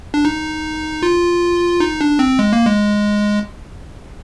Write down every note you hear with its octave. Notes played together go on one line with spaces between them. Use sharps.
D4
D#4
F4
D#4
D4
C4
G#3
A#3
G#3